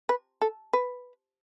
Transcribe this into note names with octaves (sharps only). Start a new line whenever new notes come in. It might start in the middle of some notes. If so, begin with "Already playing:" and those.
B4
A4
B4